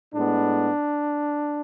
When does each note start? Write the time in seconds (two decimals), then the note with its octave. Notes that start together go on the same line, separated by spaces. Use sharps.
0.13 A2 G#3 B3 D4